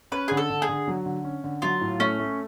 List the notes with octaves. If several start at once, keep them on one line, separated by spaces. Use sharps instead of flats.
C#4 B4
D3 G#4
A4
D3
G#4
D3
F#3
D3
C#4
D3
F#3 F4
A2
A3 C#4
A3